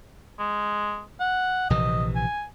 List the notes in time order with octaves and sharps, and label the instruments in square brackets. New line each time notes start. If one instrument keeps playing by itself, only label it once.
[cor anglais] G#3
F#5
[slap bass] A#1 C3 E3 [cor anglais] D#5
[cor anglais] G#5